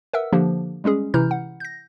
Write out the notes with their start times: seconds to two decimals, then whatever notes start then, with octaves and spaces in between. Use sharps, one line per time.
0.13 A#4 B4 E5 F#5 E6
0.32 D3 F3 A#3 D4 G4
0.84 G3 G#3 C#4 G#4
1.14 C3 E3 E4 A#5 F6 G6
1.31 F#5
1.60 G6 A#6